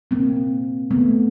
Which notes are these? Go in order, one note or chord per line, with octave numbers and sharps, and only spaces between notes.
A#3 C4
A3 B3